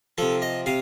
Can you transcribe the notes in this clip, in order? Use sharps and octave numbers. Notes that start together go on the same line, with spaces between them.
C3 F3 A4
D#5
C3 F5